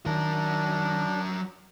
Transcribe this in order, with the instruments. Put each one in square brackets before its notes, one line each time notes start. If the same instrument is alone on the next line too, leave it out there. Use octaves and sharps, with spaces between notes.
[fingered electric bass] D#3 [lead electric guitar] F#3 A#4 [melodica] D4